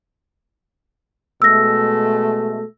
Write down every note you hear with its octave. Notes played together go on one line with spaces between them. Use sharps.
B2 G#3 A3 E6 A#6